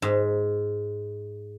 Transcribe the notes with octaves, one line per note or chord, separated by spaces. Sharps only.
G#2